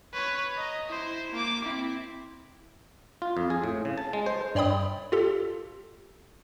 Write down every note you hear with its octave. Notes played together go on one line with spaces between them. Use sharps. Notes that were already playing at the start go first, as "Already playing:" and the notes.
B4 C#5
D#5 A#5
E4 C5
A#3 D6
C4 E4
F4
F2
G#4
A2
C#3
A5
G#3
C5
G2 C#5 D5 G5 B5 D#6
F4 G4 A4